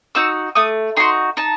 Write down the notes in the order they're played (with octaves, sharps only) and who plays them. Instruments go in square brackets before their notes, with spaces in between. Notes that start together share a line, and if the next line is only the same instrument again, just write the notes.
[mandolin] D#4 F#4 E6
A3 D#6
D#4 F#4 C6
D#4 A5